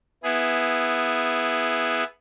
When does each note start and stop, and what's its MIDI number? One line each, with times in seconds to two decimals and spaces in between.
0.23 2.03 59
0.23 2.03 64
0.23 2.03 68